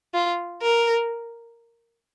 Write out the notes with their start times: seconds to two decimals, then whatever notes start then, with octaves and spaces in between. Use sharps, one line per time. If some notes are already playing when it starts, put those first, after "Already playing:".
0.14 F4
0.62 A#4